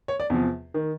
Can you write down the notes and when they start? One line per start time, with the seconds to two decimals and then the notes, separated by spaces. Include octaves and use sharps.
0.08 C#5
0.20 D5
0.30 E2 C3 F3
0.74 D#3